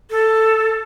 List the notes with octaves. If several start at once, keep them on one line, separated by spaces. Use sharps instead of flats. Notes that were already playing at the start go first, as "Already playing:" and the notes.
A4